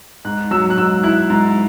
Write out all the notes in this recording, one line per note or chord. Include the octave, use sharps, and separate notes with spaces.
G#2 F#6
F#3 E6
F#6
G#2 E6
E4 F#6
G#2